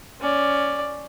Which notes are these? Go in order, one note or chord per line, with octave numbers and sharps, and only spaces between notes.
C#4 D5